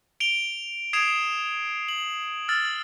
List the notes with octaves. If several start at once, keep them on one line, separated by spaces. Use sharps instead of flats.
D7 F7 G7
D#6 G#6 C7 D7 E7 F7
F#7
E6 F6 A6